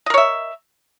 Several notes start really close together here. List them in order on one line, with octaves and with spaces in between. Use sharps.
D#5 A#4 C#5 E5